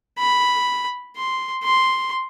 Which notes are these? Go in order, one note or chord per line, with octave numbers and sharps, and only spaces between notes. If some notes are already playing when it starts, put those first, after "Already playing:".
B5
C6
C6